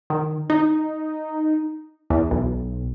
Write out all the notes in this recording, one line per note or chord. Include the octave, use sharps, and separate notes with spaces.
D#3
D#4
E2
B1